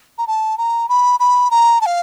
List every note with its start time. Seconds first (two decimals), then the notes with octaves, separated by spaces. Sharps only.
0.18 A#5
0.27 A5
0.58 A#5
0.89 B5
1.20 B5
1.51 A#5
1.81 A5
1.86 F5